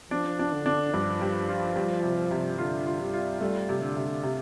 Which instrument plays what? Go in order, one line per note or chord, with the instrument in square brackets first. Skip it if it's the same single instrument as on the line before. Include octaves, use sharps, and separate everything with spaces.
[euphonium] F3 [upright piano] D4
[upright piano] D4
[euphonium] D3
[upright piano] D4
[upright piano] G2 [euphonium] F3
[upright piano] G3
F4
G3
C3
C3
[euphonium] D3 [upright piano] F4
[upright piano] F4
[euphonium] G3
[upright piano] F4
[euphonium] G3 [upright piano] A3
[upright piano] C3
[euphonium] D3
[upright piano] C3
C3